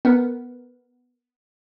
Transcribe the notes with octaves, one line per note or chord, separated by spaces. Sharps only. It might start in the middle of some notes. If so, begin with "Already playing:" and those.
B3 A#4 B4